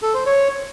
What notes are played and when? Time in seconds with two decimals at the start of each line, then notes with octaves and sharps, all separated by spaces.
0.02 A4
0.14 C5
0.26 C#5